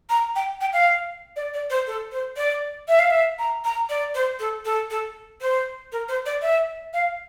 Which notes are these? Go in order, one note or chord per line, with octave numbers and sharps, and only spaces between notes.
A#5
G5
G5
F5
D5
D5
C5
A4
C5
D5
E5
F5
E5
A#5
A#5
D5
C5
A4
A4
A4
C5
A#4
C5
D5
E5
F5